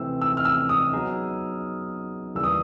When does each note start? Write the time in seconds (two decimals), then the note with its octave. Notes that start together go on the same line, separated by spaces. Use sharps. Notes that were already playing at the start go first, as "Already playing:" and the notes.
Already playing: C3 E3 A3 C4 E6
0.21 E6
0.37 F6
0.45 E6
0.69 D#6
0.93 F#3 B3 D#4 G#4
2.35 D#2 C#3 E3 G3 A#3 E6
2.44 D#6